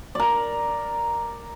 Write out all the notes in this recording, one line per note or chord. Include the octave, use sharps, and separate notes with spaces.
A#4 D5